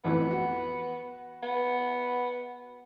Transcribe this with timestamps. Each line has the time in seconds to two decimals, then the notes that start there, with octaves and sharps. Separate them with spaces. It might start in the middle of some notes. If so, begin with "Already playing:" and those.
0.05 A1 F2 E3 B3
0.31 F#4
1.43 B3